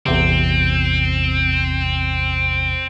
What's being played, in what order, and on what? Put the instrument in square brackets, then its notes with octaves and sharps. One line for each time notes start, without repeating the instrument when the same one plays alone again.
[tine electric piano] A1 E2 C3 [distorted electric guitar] C4